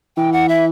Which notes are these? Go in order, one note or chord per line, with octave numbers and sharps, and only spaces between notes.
E3 G5
F#5
E5